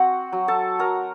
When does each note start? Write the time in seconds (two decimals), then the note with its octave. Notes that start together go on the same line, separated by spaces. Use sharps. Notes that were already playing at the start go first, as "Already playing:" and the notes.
Already playing: C4 F#4 F#5
0.32 F#3
0.48 A4 A5
0.79 F#3 A#4 A#5